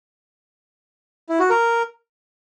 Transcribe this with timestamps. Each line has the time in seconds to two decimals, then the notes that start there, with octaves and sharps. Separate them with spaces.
1.29 E4
1.40 F#4
1.50 A#4